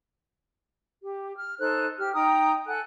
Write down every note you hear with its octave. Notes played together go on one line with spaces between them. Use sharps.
G4
F6
D#4 A4 C5 F#6
G4 F6
D#4 G5 A#5 D#6
A4 F#5 G#5 F#6